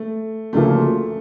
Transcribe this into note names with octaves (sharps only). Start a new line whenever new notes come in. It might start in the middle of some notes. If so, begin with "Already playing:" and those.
Already playing: A3
D2 C#3 F3 A3 A#3